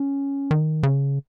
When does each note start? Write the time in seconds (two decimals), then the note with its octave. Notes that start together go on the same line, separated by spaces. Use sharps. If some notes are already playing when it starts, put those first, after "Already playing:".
Already playing: C#4
0.51 D#3
0.83 C#3